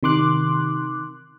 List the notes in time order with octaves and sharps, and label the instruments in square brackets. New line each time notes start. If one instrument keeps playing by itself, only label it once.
[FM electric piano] C3 D#3 C6 D6 F#6